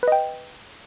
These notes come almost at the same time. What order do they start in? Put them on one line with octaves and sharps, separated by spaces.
B4 D#5 G5